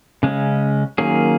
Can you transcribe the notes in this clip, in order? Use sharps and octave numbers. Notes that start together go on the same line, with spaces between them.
C#3 G#3 C#4
D#3 F#3 A#3 C#4 G#4